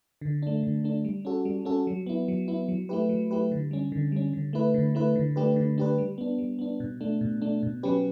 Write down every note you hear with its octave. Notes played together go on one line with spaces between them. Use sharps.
D3
A3 D4
D3
A3 D4
G3
C#4 F#4 A4
G3
C#4 F#4 A4
F#3
B3 E4
F#3
B3 E4
F#3
A3 E4 G4 B4
F#3
A3 E4 G4 B4
D3
G3 C#4
D3
G3 C#4
D3
A3 E4 B4
D3
A3 E4 B4
D3
A3 D4 G4 B4
D3
A3 D4 G4 B4
G3
B3 D4
G3
B3 D4
B2
A3 D4
B2
A3 D4
B2
F#3 C#4 G4 B4